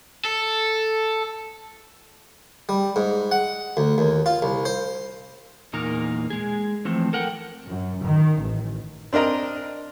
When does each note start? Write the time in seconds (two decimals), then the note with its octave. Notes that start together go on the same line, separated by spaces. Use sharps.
0.25 A4
2.69 G3
2.96 G#2
3.31 F#5
3.77 D2
3.98 D#2
4.26 F4
4.42 C2
4.65 C5
5.73 E2 A#2 A#3 D#4 A#4
6.30 G#3 G#4
6.85 E3 F3 A3 C4
7.13 A4 A#4 F#5 G5
7.68 F#2
8.05 D#3
8.41 A1
9.13 C4 D4 A#4 D#5 A#5